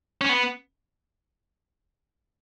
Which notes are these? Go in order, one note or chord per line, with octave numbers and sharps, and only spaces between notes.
C#4
B3